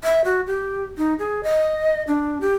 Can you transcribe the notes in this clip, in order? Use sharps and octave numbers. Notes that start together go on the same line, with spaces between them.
E5
F#4
G4
D#4
G#4
D#5
D4
G4